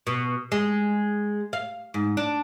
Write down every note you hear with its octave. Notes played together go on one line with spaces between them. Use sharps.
B2
G#3
F5
G#2
D4